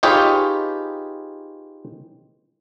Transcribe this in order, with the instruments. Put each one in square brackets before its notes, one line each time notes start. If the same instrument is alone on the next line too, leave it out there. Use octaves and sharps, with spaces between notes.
[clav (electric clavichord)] D#4 F4 G4 G#4 B4 C#5